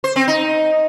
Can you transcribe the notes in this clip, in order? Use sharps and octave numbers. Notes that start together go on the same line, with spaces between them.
C5
C4
D#4